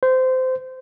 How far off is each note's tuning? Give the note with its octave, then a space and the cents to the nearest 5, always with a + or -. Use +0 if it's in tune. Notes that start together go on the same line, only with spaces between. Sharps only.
C5 -20